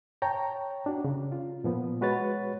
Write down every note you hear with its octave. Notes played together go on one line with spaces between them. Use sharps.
C#5 G5 A5 A#5
D4 F#4
C#3
F4
A#2 F3 B3
G#3 F#4 B4 C#5 A6